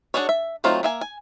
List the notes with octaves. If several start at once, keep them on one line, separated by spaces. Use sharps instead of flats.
D4 F#4 G#4 A4 C#5
E5
F#3 A3 C4 D#4 F4
A#3 E5 G#5
G#5